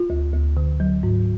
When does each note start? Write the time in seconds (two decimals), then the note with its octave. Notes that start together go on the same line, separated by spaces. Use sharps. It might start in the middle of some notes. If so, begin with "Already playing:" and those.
Already playing: F4
0.10 D2
0.33 D2
0.57 D3
0.80 F#3
1.03 G#2